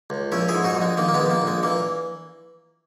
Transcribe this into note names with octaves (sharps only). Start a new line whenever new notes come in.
C#2
A#1 C#4 E4
E4 G#4
G#2
D#4 F#4
A#1
G#3
D#3 A#3
A#3
G#3 B3
A#1
A#3
A#1
G#3
E3 A#3